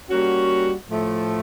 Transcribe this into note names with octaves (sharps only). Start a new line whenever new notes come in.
G3 A#3 C#4 F#4
A2 F3 A3